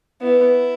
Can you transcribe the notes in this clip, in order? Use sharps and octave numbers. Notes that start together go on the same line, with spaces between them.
B3 E4